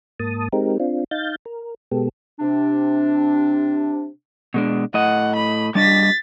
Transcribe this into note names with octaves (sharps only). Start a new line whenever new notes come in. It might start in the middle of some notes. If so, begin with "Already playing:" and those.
G#2 A#3 A5 D#6
G#3 C4 D#4 G4 A#4
C4 D4 F4
D#4 F5 G6 A6
A#4
B2 G#3 B3 G4 A4
C3 D4
B2 G#3 D4
A2 D#5 F#5
B5
G3 D4 D#5 A6 B6